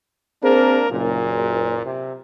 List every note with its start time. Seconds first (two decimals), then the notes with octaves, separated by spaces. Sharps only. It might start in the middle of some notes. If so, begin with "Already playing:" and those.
0.43 A#3 C4 D4 G#4 A#4 C5
0.90 F#1 A#2
1.86 C3